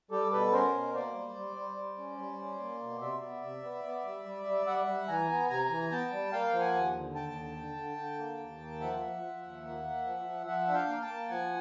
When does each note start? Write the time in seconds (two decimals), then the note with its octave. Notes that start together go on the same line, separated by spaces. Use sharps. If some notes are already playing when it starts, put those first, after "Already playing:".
0.11 G3 G4 A4
0.32 B2 A4 B4
0.52 C#4 A#4 C5
0.74 B2
0.94 A#3 C5 D5
1.14 G3
1.36 G3
1.56 G3
1.77 G3
1.98 C#4
2.18 G3
2.38 C#4
2.59 A#3
2.80 B2
3.01 C3 D5 E5
3.22 B3
3.42 C3
3.63 B3
3.84 B3
4.05 G3
4.25 G3
4.46 G3
4.66 G3 E5 F#5
4.87 G3
5.08 E3 G#5 A#5
5.29 B3
5.50 C3 G#5 A#5
5.70 E3
5.91 B3 G5 A5
6.11 G3
6.32 A#3 F5 G5
6.52 F3
6.60 F#5 G#5
6.73 D#2
6.95 D3
7.15 D#2 G5 A5
7.35 D3
7.56 D3
7.77 D3
7.97 D3
8.18 A#3
8.39 D#2
8.60 A#3
8.80 F3 E5 F#5
9.01 F3
9.22 F3
9.43 D#2
9.64 A#3
9.84 A#3
10.04 F3
10.25 F3
10.46 F3 E5 F#5
10.67 D4
10.74 F5 G5
10.88 A#3
11.01 G5 A5
11.08 A#3
11.29 F3 F#5 G#5